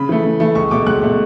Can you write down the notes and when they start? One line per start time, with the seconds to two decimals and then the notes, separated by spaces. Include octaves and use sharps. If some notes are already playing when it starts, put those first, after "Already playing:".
Already playing: C#3 B5
0.09 E3 A3
0.24 C#3
0.40 E3 A3
0.55 C#2 C#6
0.71 B2 A3 D6
0.86 C#2 F#6
1.02 B2 A3